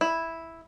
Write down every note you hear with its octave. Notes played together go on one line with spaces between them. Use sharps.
E4